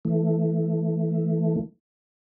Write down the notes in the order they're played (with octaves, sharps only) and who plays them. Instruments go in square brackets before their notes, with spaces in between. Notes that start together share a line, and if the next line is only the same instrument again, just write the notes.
[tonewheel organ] E3 A3